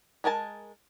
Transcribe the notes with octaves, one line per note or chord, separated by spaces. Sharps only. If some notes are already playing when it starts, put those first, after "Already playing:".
G#3 A#4 G#5 A5